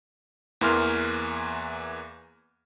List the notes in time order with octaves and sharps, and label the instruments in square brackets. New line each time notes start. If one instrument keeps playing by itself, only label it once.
[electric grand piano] E2 E3 A#3 C6 F6